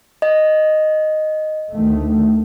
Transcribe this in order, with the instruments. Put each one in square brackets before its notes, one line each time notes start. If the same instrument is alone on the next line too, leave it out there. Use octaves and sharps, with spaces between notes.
[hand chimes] D#5
[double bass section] D2 D#3 A3